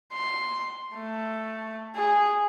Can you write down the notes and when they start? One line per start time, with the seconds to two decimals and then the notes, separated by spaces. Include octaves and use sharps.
0.13 C6
0.95 A3
1.95 G#4